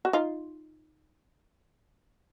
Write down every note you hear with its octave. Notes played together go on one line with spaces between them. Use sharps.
F#4
D#4 F4